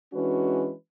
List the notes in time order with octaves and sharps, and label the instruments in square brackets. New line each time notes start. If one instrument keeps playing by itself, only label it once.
[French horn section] E3 G#3 C#4 D4 F#4 B4